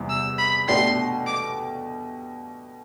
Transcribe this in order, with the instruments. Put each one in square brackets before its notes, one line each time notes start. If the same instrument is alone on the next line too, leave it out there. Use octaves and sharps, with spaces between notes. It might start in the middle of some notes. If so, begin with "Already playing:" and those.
Already playing: [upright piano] E2 C3 E3 G3 B3
[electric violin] E6
B5
[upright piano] B2 A3 D4 G4 [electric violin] C6
[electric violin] D6